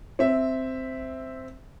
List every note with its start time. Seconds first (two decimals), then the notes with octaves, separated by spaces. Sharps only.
0.19 C4 E5